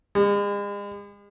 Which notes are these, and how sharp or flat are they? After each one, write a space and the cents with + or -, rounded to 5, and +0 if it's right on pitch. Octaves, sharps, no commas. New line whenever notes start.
G#3 -40